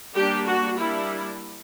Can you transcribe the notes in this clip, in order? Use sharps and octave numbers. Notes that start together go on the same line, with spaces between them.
G3 A#3 D4 G4
F#4
G3 A#3 D4 E4